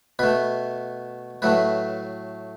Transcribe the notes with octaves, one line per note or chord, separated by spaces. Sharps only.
B2 A3 B4
A2 F#3 A3 B4